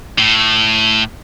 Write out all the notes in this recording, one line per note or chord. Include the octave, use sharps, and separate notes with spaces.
A2